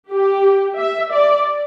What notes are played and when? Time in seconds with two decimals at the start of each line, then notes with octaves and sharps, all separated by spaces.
0.11 G4
0.78 E5
1.12 D5